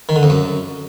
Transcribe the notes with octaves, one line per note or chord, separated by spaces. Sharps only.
D#3
D3
F2
F#2